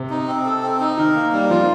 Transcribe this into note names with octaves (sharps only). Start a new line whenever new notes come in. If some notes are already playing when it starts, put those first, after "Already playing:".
Already playing: C3
D#4
C4
A4
C4
D#4
D#3 A#4
A#3
G3
F3 F4